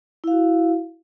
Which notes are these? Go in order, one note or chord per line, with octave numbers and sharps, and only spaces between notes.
E4 F#4 F5